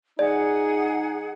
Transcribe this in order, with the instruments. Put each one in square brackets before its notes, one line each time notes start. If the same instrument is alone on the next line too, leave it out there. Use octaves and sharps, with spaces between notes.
[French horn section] F3 D#4 [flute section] G#4 F#5 [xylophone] D5